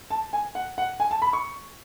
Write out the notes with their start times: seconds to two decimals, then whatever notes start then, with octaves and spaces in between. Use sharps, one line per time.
0.10 A5
0.33 G#5
0.55 F#5
0.78 F#5
1.00 G#5
1.11 A5
1.22 B5
1.33 C#6